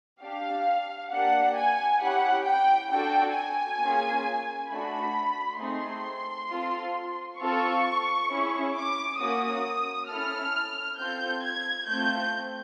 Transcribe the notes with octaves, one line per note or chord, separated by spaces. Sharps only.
D4 G4 F5
A#3 D4 G4 F#5
G#5
C#4 E4 G4 F#5
G5
D4 F#4 A4 G5
G#5
A#3 C#4 F4 G#4
A3 D4 F#4 B5
A3 C4 D#4 G#4 C6
C4 F4 A4
C4 F4 A4 C#6
C#4 E4 G#4
D6
A#3 C#4 F#4 D#6
C#4 E4 A4 F6
C4 F4 A4 G6
G#6
A3 C4 F4 G6